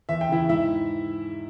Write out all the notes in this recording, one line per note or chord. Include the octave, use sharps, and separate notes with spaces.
E2 E5
G5
C#3 E3 E4 E5
G#2 E4 E5